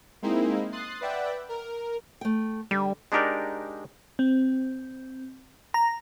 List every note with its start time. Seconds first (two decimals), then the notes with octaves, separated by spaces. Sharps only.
0.22 G#3 A#3 C4 D#4 E4
0.72 C6 D#6 F#6 A6 C7
1.01 B4 D5 E5 F#5 G5
1.49 A#4
2.21 A3 G5
2.71 D3 G3
3.12 G#3 D4 D#4 G4 A#4 D5
4.19 C4
5.74 A#5